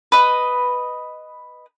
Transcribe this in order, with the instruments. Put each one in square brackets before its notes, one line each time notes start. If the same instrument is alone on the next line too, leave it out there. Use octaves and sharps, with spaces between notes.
[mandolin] B4 D#5